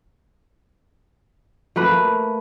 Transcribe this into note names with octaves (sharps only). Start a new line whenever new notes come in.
A3 A#3 B4